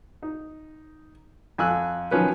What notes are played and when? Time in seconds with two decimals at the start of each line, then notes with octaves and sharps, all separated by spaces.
0.23 D#4
1.58 F2 G#5 E6 F#6
2.11 D#3 F3 F#3 C#4 B4